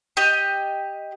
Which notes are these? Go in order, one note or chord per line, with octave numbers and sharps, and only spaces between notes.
G4 D#5